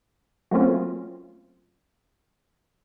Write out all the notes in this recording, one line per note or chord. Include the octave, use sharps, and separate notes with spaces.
F#3 A3 A#3 C4 C#4 F4